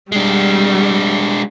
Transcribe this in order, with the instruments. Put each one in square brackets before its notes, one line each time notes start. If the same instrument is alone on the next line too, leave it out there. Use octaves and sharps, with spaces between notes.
[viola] G3 [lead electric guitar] G#3 D4